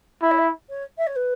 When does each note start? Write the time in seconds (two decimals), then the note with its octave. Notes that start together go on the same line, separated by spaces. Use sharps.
0.22 E4 E5
0.31 C#5
0.38 E5
0.69 C#5
0.98 E5
1.06 C#5
1.15 B4